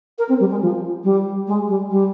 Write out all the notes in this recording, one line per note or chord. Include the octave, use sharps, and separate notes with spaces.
A#4
C4
G3
G#3
F3
G3
G#3
G3
G3